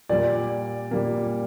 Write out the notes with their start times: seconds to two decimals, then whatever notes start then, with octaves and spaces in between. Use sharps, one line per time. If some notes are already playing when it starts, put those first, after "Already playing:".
0.09 A#2 G3 A#3 D5
0.91 A#2 G3 A#3